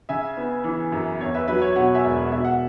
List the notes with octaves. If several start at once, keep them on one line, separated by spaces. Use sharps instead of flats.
C#3 E5 G#5
B3
E3
F#2
E2 C#5
B4 E5
F#3 B4 E5
C#5
B2 C#5 F#5
E5 G#5
E1
B2 E5
F#5